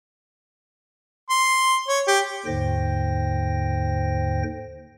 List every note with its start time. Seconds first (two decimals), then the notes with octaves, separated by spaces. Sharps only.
1.30 C6
1.88 C#5
2.07 G4
2.46 D#2 G#2 D3 C5 G5 A#6